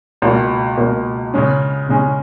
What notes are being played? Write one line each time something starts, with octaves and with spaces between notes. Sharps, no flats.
C#2 B2 A#3
C#2 B2 A#3
C#3 G#3 C#4
C#3 G#3 C#4